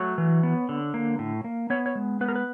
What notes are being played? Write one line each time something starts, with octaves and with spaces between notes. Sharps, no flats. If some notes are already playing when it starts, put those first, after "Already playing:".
Already playing: F#3 A3 C#5
E3
B3
D3
A#3
A2
A#3
B3 C#5
C#5
G#3
B3 B4
A#4
B4